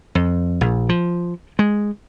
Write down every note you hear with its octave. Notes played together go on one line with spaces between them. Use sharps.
F2
A#1
F3
G#3